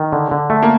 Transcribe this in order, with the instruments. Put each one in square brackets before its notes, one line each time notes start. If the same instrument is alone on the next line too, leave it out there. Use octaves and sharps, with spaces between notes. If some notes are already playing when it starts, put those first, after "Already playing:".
Already playing: [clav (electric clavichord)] D#3
D3
D3
A3
[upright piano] A#3